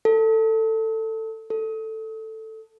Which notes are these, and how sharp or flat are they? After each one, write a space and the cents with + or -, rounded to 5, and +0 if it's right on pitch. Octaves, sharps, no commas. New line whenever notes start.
A4 +15
A4 +5